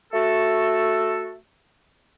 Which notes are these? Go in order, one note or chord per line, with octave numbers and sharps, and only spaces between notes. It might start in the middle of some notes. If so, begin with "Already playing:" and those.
A3 F#4 A4